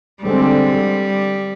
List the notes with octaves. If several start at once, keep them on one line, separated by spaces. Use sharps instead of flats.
D3 G3 G#3 C4